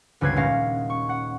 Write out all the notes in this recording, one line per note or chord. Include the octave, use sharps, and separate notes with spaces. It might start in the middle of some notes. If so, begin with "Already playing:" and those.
G1 C#2 G3 B4 G#6 C7
D#1 G#3 C#4 F5 A#6
C#6
F#5